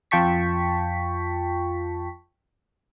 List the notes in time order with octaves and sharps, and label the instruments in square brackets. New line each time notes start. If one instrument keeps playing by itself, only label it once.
[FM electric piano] F2 F4 G5 A5 C#6 B6